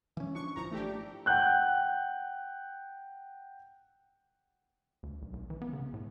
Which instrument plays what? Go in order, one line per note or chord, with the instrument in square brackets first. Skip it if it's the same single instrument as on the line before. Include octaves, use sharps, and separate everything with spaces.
[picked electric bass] E3 C#4
[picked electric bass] F3 D4 [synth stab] C#6
[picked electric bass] G#1 E3 F3 [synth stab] A#5
[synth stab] A3 D4 G4
[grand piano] F#5 G5 F#6 G6
[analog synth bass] D2
B1
B1
E3
B3
C#3
A2